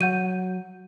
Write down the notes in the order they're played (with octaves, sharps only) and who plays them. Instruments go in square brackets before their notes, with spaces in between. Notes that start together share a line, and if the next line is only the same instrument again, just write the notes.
[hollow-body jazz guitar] F#3 [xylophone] F#5 G6 D#7